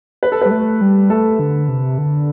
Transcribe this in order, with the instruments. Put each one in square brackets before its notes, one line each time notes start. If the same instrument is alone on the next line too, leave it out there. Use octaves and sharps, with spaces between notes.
[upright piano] B4
A4
[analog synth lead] G3 [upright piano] B4
[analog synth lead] A3
G3
[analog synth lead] A3 [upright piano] A4
[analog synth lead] D3
C3
D3